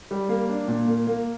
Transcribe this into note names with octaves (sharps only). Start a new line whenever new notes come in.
G3
A#3
D4
A#2
A#3
A#3